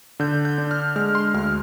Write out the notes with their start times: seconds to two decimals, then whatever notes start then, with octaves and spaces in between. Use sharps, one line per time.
0.20 D3 G6
0.45 G6
0.58 D4
0.71 F6
0.96 G#3 F6
1.15 C6
1.34 D2 F6